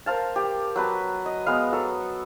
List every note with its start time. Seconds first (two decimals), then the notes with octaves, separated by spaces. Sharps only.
0.06 A#4 C5 F5 A5
0.36 G4
0.76 F#3 B4 A5
1.26 D#5
1.46 G#3 B3 F5
1.72 F#3 A4